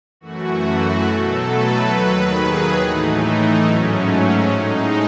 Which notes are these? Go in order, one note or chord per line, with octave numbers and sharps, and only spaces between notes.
F#2 E3 A3 F#4
F#4
B2 F#3 A3 A4
B4
D#2 D#3 F#3
G#4
A2 E3 A3 D#4
D#4
G#2 F#3 A3 C#4
C#4
A2 G#3 D#4